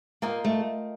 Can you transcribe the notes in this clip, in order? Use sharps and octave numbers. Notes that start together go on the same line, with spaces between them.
A#3 F4 A#4 D#5 G5
A3